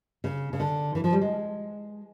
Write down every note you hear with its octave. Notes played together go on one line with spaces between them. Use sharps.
C#3
C#3
D3
E3
F3
G3
G#3